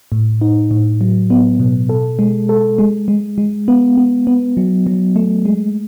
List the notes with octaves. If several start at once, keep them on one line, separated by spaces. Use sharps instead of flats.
A2
D#4
A2
F#3
B3
B2
A4
G#3
A4
G#3
G#3
G#3
B3
B3
B3
F#3
F#3
A3
G#3